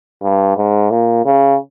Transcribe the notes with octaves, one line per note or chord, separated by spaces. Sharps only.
G2
G#2
A#2
C#3